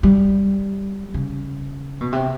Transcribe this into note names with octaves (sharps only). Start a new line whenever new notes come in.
G3
C#3
B2
C3